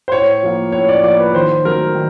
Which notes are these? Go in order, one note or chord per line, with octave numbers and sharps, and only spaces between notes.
C5
A2 C#5
F3 A#3
A2 C#5
D5
F3 A#3 D5
B4
D#3 C5
F#3 A3 A#4
D#3